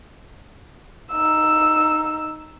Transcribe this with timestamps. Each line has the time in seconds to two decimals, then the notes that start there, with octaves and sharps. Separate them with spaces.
1.12 D#4 E6